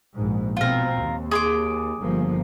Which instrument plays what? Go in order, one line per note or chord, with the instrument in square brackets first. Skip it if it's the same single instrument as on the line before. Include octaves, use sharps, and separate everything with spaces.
[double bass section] A#1 G#2
[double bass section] B2 C4 [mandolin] F4 A#4
[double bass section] D#2
[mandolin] G#4 C6 D6
[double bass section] G1 F3 A#3